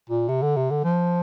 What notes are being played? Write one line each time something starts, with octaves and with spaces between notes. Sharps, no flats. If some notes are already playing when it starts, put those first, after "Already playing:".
A#2
C3
D3
C3
D3
F3